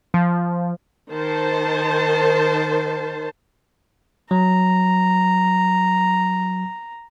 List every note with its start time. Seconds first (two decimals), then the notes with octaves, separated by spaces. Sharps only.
0.14 F3
1.12 D#3 C5 A5
4.31 F#3 A#5